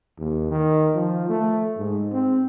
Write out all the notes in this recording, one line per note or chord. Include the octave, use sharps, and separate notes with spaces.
D#2
D#3
F3
A3
G#2
C4